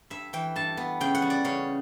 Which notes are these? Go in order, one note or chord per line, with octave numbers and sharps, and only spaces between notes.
G2 E5
E3 G5
G2 A5
B3
C#3 G5
F#5
G3
D5
C#3 C#5